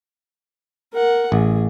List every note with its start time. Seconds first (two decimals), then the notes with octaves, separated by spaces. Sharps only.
0.93 A#4 F#5
1.32 A1 G#4